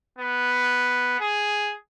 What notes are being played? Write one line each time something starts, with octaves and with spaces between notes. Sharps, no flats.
B3
G#4